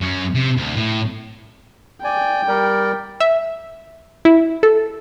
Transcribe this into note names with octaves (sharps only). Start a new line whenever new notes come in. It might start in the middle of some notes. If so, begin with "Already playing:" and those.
F#2 C#4
C3
D2
A2
D5 G5 G#5
G3 A#4 D5
E5
E4
A4